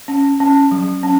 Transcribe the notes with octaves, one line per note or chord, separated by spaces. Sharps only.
C#4
C#4
F#3
C#4